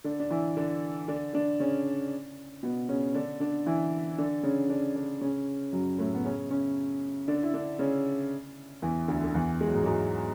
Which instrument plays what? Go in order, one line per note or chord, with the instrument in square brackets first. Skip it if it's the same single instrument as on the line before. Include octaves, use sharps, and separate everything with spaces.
[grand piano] D3 D4
D4
E3 E4
D3 D4
D3 D4
D3 D4
C#3 C#4
B2 B3
C#3 C#4
D3 D4
D3 D4
E3 E4
D3 D4
C#3 C#4
D3 D4
D3 D4
C#3 C#4
F#2 F#3
A2 A3
B3
C#3 C#4
C#3 C#4
D3 D4
E4
D3 D4
C#3 C#4
E2 E3
D2 D3
D3
E2 E3
G#3
F#3
G#2 G#3
F#3
G#2 G#3